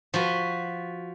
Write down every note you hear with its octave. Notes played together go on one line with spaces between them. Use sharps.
F3 F#4 B4